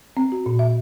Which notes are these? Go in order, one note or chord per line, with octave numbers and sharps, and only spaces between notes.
C4
F#4
A#2
E5